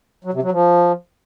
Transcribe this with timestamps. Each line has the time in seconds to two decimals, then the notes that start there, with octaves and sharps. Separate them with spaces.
0.24 F#3
0.34 C3
0.43 F#3
0.52 F3